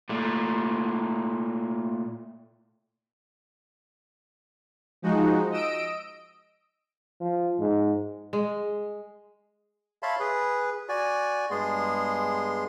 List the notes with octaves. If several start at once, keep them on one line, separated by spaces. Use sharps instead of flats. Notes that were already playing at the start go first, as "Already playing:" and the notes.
A#2 A3
F3 G#3 D#4 F#4
D#5 E6 D7
F3
G#2
G#3
C#5 E5 F5 A5 B5 C6
G#4 B4
F#4 D5 G#5
G2 G#3 B3 G#4 C6